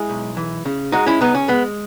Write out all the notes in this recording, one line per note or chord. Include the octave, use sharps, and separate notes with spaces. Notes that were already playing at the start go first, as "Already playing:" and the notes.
Already playing: G#3 E4 G#4
B1
E3
C#3
G#3 D#4 F#4
C#4 E4
C#2 B3 D#4
C#4
G#3 B3